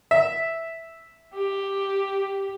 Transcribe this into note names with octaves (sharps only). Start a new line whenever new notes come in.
E5
G4